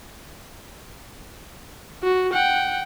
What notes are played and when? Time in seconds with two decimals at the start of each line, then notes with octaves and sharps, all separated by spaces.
2.03 F#4
2.34 F#5 G5